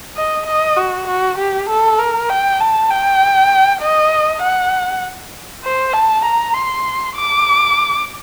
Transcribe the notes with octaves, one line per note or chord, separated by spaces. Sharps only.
D#5
D#5
F#4
F#4
G4
A4
A#4
G5
A5
G5
D#5
F#5
C5
A5
A#5
C6
D6